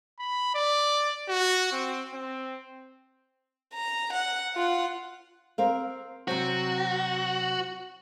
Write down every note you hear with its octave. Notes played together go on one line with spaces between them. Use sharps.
B5
D5
F#4
C4
C4
A#5
F#5
F4 F#5
C4 A#4 F5
C3 F#3 C4 F#4